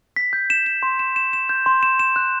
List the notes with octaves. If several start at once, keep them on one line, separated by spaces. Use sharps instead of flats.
B6
G6
E7
E7
C6
E7
E7
E7
G6
C6
E7
E7
F#6